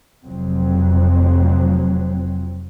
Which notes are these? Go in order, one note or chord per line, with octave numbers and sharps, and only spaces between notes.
F1 F2 F#3 C4